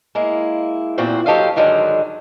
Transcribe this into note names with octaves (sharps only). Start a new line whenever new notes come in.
G#3 A#3 E4
E2 A#2 C4 F#4 C5
F#3 G4 A4 C5 D#5 F5
G2 D3 D#3 F#3 G#3